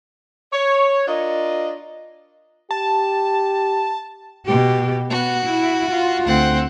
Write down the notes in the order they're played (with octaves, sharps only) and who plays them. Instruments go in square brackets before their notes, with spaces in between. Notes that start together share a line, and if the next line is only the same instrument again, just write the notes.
[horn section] C#5
D4 F4 A#4 D#5
[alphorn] G4 [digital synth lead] A5
[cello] B2 G4
[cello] B3 [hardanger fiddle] F#4
[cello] E4
F4
[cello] D2 [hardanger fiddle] C4 F#5